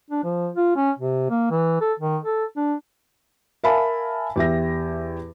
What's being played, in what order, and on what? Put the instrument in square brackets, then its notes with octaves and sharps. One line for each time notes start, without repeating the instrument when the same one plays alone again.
[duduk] D4
F3
F4
C#4
C3
A#3
E3
A4
D#3
A4
D4
[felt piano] A#4 E5 F5 G#5 A5 B5
E2 G4 E5 A#6